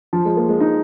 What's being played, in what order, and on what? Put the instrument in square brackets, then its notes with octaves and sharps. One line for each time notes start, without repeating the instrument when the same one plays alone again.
[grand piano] F3
G#3
A#3
G#3
D#4